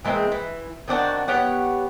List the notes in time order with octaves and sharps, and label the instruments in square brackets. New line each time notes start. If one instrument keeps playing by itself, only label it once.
[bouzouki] E3 G#3 A#3 C4
E3
D#3 C4 D4 F#4
B3 G4 C#5 F#5